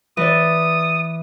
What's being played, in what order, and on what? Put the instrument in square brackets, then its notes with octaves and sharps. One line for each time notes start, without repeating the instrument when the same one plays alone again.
[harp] E3 D5 [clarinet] D#6